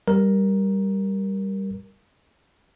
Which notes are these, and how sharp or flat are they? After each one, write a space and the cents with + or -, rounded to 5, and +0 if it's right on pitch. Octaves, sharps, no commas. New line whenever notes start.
G3 +0 A#4 +10